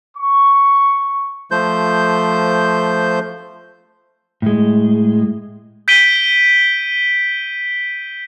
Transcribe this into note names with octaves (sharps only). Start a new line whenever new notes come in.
C#6
F3 A3 C5 G6
A2 G#3
G6 B6 D7 D#7 G7